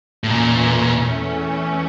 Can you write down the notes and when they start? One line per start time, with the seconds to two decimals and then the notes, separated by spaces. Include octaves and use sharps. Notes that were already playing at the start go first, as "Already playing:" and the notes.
0.24 A2
0.29 E2 A#2 E3 A3 C#4